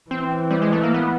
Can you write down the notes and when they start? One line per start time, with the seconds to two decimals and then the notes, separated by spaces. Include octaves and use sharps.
0.11 E3 C4
0.51 G3
0.62 G#3
0.73 A3
0.83 A#3
0.94 B3